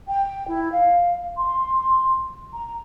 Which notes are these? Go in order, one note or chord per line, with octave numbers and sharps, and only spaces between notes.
G5
E4
F5
C6
A#5